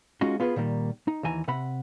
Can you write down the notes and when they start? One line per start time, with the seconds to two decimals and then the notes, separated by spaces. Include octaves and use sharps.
0.21 G#3 C#4 D#4 F4 F#4
0.40 B3 F4 G#4 B4
0.56 A#2 D#3 G3 A#3
1.08 D#4
1.23 D#2 E3 G#5 A#5
1.48 C3 F#5 B5